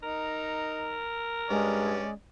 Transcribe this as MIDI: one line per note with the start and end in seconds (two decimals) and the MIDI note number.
0.03 0.99 63
0.03 1.85 70
1.50 2.02 43
1.50 2.14 56
1.50 2.09 61
1.50 2.09 74